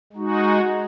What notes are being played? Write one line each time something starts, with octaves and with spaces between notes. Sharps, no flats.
G#3 D#4 F#4